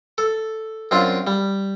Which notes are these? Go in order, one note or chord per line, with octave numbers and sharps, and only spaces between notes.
A4
F#2 C4 D4 F4
G3